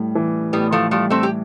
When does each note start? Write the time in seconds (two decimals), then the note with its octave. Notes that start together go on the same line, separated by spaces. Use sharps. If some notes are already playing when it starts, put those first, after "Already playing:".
Already playing: A2 G3
0.15 E3
0.53 A2 G3 B3
0.72 F3 A3
0.91 F3 G3 A3
1.10 A3 C4
1.23 G4